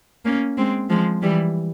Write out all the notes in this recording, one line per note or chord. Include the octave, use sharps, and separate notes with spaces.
A#3 C#4
G#3 C4
F3 G#3
E3 G3